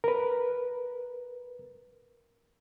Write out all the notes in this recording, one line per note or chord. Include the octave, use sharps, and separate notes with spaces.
A#4 B4